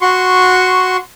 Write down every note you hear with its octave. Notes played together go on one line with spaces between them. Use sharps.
F#4 C6 C#6